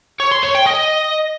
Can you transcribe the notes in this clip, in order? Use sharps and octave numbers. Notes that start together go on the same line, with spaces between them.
C#5
C6
C#5
G5
D#5